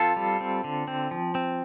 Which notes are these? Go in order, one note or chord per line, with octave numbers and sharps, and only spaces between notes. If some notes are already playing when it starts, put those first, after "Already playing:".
Already playing: F3 C4 F4 A4
G3
C4
D3
C4
F3
C4